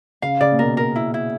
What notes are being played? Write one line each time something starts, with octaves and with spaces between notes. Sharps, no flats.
C#3 F5
C#3 D5
A#2
B2 A#4
A#4
E4
E4